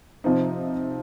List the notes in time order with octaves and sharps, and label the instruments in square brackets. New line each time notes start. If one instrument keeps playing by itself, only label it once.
[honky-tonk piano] C3 F3 C4 D#4